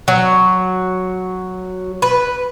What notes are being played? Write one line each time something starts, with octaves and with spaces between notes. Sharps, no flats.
F#3
B4